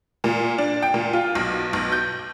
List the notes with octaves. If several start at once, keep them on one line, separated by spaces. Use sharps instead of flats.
A#2
D4
G5
A#2
F4
B1
B1
G6